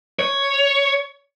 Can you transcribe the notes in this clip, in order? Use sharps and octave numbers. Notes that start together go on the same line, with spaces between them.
C#5